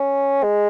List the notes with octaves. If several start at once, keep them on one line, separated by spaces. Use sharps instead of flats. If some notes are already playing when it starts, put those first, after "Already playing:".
Already playing: C#4
G#3